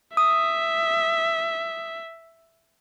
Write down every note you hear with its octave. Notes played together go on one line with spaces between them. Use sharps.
E5 D#6